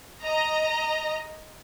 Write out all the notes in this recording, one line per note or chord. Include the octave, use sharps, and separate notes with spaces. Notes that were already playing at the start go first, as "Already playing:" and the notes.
D#5 A#5